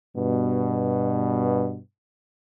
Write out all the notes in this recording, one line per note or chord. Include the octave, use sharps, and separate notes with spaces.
G2 B2